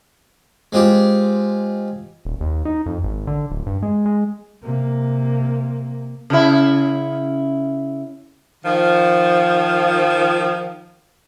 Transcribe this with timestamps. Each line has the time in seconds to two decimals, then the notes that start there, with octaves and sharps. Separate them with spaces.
0.73 G#3 C4 F4 G4
2.25 D#1
2.41 D#2
2.65 D#4
2.86 F2
3.03 G#1
3.27 D3
3.50 D1
3.66 G2
3.82 G#3
4.06 G#3
4.62 C3 A#3
6.30 C#3 E4
8.65 D#3 F3